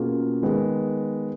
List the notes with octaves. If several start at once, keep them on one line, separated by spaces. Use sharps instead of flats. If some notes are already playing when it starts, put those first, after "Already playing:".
Already playing: B2 A#3 C#4 F4 G#4
D#3 G#3 B3